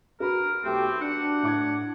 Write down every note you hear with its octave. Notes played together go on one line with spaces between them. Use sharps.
F#4 A#4 B4 B5
B1 A3 C4 G4
D4 F#5
A2 D6 G#6